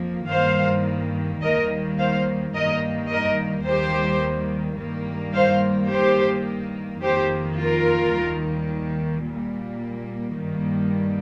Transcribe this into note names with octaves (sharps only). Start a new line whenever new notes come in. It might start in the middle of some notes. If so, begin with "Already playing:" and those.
Already playing: F2 F3 A#3
G2 D#3 G3 A#3 C5 F5
D#2 D#3 G3 A#3 A#4 D#5
C5 F5
G2 D#3 G3 A#3 A#4 D#5
A#4 D#5
D#2 D#3 G3 A#3 G4 C5
G2 D#3 G3 A#3
C5 F5
G2 D#3 A#3 G4 C5
F2 D#3 A#3 G4 C5
F4 A#4
D#2 D#3 G3 A#3
A#2 G3 A#3
G2 D#3 G3 A#3